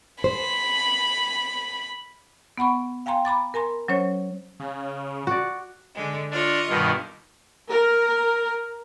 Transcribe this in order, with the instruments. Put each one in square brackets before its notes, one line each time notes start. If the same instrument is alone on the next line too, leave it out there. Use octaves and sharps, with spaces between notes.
[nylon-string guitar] C5 [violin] B5
[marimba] B3 F#5 B5 C#6
F5 G5 G#5 A#5 C6
A#5 B5 D6 A6
A#4 G#5 A#5 C6
F#3 C#4 C5 C#5
[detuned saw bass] C#3
[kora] F#4 D5
[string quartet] D3 G#3
[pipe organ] D4 [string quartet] F4 D#5 C#6
[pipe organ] G2 B2 D#3
[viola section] A#4